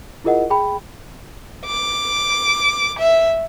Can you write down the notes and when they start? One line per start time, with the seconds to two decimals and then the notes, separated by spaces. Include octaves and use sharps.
0.24 E4 F4 G#4 A#4 D#5 F#5
0.50 G#4 G5 B5
1.66 D6
2.99 E5